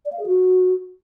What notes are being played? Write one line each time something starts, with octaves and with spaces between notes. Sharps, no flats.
D5
F5
G#4
F#4